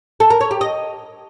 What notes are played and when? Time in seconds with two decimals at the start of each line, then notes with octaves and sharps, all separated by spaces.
0.20 A4
0.30 A#4
0.41 C#5
0.51 G4
0.61 D#5